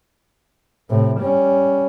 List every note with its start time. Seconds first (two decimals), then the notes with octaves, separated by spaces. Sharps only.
0.90 A2 C3
1.20 G3 C#4